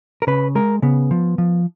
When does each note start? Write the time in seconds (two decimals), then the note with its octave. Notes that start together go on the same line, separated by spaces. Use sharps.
0.22 A#4
0.27 C#3 B4
0.55 G#3 A#4
0.82 C#3 B3
1.11 F3
1.38 F3